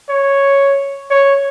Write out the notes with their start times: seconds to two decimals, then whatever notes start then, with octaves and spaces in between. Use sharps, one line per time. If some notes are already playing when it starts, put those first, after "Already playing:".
0.10 C#5
1.10 C#5